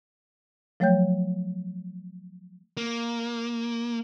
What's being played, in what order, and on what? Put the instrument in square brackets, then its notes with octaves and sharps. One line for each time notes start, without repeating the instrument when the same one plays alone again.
[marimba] F3 F#3 A3 C#5 G5 G6
[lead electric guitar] A#3